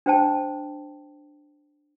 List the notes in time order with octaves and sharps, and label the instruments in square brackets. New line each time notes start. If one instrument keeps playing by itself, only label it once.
[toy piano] D4 C5 G5 A5